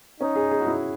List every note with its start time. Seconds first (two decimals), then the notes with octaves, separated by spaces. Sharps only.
0.20 C#4 D#4
0.36 G#4
0.51 G#4
0.61 F#4
0.67 E4